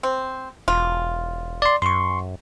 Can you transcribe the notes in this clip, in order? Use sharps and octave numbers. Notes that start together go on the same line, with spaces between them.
C4
E1 F4
D5 C6
F#2 C6 C#6